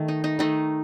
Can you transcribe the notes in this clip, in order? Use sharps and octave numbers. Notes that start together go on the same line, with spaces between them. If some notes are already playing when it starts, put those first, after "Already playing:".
Already playing: D#3 A3
D#4
D#4
D#3 A3 D#4